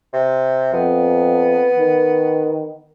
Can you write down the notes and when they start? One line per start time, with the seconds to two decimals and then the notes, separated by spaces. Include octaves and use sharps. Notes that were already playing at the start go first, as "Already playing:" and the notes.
0.13 C3
0.73 F2 B3
1.78 D#3